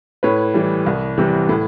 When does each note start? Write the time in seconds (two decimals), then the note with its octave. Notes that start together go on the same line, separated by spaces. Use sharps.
0.23 A2 B4 C#5
0.54 E3 G3
0.86 C2
1.18 C3 E3 G3
1.49 A2